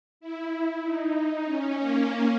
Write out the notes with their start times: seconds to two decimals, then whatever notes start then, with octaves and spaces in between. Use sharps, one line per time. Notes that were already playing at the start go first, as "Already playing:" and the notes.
0.20 E4
0.82 D#4
1.45 C#4
1.76 A#3